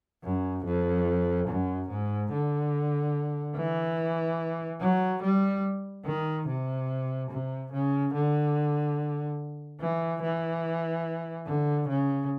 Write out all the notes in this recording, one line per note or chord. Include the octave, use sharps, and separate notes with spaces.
F#2
F2
F#2
G#2
D3
E3
F#3
G3
D#3
C3
C3
C#3
D3
E3
E3
D3
C#3